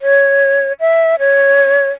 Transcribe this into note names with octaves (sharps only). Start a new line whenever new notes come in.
C#5
E5
C#5